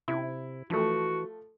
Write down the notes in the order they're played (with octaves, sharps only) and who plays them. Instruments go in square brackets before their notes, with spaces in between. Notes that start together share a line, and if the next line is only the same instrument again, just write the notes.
[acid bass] C3 [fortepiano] E4
[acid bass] E3 [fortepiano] F3 A3 [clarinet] F#4